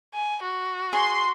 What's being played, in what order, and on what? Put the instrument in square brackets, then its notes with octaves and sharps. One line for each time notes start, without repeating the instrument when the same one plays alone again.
[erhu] G#5
F#4
[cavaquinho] G#4 [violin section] C6